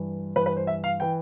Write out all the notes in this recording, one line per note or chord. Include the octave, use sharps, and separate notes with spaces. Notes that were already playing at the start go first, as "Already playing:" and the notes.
Already playing: G2 E3
G2 E3 B4
B4
C5
E5
F5
E3 G5